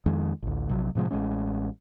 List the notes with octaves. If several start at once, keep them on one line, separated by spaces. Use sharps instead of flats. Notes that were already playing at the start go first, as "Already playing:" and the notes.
F2 D#3 G#3
A1 D2
A#1 C3 F#3
A2 C3 F3 G#3
A1 E3 G#3 C#4